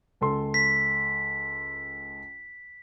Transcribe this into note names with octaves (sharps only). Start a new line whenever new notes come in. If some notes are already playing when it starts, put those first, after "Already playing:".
C#2 A4 C6
B6